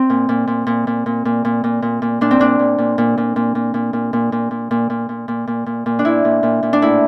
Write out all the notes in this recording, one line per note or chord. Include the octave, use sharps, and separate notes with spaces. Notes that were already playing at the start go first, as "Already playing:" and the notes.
Already playing: C4
A#2
A#2
A#2
A#2
A#2
A#2
A#2
A#2
A#2
A#2
A#2
A#2 D4
C4
A#2 D4
A#2
A#2
A#2
A#2
A#2
A#2
A#2
A#2
A#2
A#2
A#2
A#2
A#2
A#2
A#2
A#2
A#2
A#2
D4
A#2 E4
A#2
A#2
A#2
D4
A2 E4